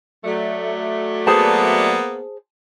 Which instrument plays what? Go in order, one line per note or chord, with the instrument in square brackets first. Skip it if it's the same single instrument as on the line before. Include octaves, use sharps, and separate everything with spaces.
[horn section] F#3 A3 D5
[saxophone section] A#3 B3 [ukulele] G#4 C5 A5